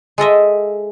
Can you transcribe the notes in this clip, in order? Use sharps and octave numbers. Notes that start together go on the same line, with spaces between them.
G#3 A4 D#5 E5